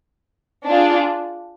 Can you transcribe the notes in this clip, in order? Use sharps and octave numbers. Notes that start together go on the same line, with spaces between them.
D4 F4 G#4